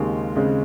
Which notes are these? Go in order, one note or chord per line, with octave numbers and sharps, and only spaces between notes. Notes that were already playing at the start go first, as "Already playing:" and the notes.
Already playing: D#2 C#3 G#3 C4
C#3 G#3 C4